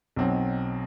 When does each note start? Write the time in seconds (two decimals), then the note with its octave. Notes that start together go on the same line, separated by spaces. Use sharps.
0.16 B1 B2 F#3 C4